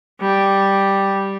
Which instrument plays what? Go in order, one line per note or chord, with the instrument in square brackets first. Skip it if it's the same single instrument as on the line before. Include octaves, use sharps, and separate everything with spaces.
[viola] G3